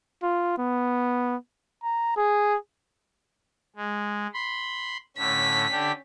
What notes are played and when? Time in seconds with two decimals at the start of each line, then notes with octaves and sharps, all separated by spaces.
0.23 F4
0.58 B3
1.84 A#5
2.17 G#4
3.76 G#3
4.34 B5 C6
5.18 A2 D3 C#4 B6
5.71 D3 D4 G4